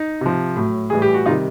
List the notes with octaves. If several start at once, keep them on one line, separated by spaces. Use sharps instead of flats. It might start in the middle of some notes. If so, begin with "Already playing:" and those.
Already playing: D#4
C3 F3
A2 F#3
A2 E3 G3 G#4
G4
F#4
C3 D#3 G3 D#4 F4